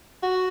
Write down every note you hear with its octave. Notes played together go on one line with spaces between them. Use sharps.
F#4